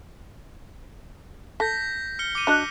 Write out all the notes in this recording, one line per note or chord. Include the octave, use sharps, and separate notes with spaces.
A4 G6 A#6 B6
F6 C#7 G7
D6 C#7 D#7
D4 F#4 D#5